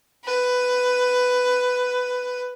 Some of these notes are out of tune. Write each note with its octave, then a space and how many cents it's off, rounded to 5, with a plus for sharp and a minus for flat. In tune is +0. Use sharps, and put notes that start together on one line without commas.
B4 +10